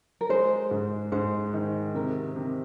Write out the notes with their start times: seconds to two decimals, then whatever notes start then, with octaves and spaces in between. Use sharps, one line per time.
0.21 A#4
0.29 G#3 C5
0.71 G#2
1.12 G#2 C5
1.54 D#3
1.95 C3 A#4
2.36 C3